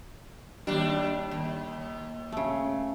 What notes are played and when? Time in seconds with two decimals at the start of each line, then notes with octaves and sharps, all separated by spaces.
0.67 D#2 G3 D4
1.31 D#2
2.32 C#3 A3